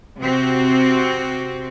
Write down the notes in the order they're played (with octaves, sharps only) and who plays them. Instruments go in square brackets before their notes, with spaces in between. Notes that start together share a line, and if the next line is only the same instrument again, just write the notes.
[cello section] C3 C4 F#4